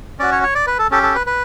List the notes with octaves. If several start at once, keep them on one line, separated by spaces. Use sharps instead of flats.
C#4 F#4 D5
C#5
C#5
D5
B4
A4
C#4 G4 A4
A4
B4
B4